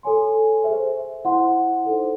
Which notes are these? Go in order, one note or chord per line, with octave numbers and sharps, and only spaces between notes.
A4 C#5 G#5 C6
G#4 C5 E5
E4 C5 F#5 C6
D#4 A4 C5